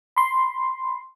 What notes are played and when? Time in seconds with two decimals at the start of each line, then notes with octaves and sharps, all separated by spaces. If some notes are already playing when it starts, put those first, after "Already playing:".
0.16 B5 C6